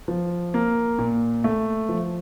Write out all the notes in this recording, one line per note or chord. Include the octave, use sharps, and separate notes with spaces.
F3
A#3
A#2
A3
F3